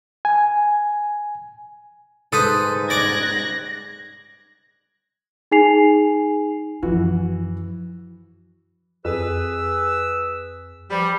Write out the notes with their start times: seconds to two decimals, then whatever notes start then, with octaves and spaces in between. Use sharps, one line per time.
0.25 G#5
2.33 G#2 A4 B4 C5 D#6
2.90 D5 D6 F#6 G#6 A#6
5.52 D#4 G#4 G#5 C7 F7
6.83 F#2 E3 F3 F#4
9.05 F2 G#4 B4 E6
10.91 E3 F3 G3 B5